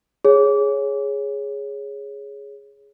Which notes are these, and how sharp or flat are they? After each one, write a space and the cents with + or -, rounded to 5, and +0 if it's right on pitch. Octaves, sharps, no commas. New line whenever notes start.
G#4 +0 C#5 +0